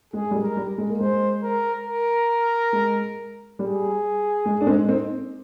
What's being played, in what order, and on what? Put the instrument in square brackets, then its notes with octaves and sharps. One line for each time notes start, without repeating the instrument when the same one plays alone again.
[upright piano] G#3 [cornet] G#4
[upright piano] G3
G#3
[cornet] A#4
[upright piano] G3
G#3
A#3
[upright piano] G#3 [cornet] C5
[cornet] A#4
A#4
[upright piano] G#3
[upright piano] G3 [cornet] G#4
[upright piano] G#3
D4
G#3 C4
C4 D#4